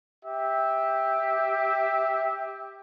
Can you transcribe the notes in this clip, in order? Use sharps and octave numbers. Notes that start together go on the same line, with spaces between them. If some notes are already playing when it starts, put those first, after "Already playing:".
G4 E5